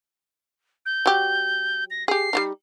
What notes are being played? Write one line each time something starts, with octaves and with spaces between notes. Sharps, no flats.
G6
F#3 G4
A#6
G4 G#4 C7
G3 D4 D#4